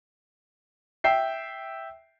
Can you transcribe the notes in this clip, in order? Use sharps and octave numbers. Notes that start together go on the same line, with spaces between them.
E5 G5 C7